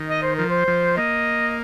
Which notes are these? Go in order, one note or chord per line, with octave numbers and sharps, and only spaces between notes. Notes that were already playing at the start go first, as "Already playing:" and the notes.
Already playing: D#3
D#5
C5
F3 A#4
C5
F3
A#3 D#5